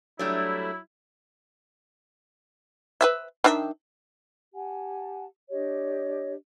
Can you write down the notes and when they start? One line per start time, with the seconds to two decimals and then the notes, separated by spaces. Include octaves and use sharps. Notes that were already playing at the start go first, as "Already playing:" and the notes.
0.19 F#3 G3 A3 D4 E4
3.01 B4 C5 E5
3.44 D#3 D4 E5
4.53 G4 F#5 G#5 A5
5.51 D4 G4 C#5 D#5